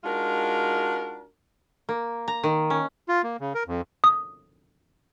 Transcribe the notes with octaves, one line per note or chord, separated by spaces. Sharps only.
G#3 D4 D#4 F4 F#4 A#4
A#3
A#5
D#3
C#4
F4
A#3
C#3
A#4
F2
D#6